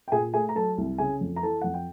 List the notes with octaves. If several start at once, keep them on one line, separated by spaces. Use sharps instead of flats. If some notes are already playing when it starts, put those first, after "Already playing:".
G5
A#2 G#4 G#5
A3 G#4 G#5
A#5
F#3 A4 A5
C2
C#3 G#4 G#5
F2
A#5
E3 A4 A5
F2 F#5
G5